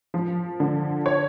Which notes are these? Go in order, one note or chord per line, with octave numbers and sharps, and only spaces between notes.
F3
D3
C#5